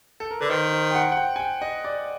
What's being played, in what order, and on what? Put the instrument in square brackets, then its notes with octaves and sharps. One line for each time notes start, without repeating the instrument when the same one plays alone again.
[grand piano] A4
A#4
[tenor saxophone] D3 [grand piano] B4
[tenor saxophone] D#3 [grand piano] C5
[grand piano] C5
G5
F#5
F#5
G5
G#5
G5
D#5
D5